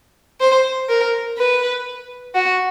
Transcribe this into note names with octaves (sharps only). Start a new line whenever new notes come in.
C5
A#4
B4
F#4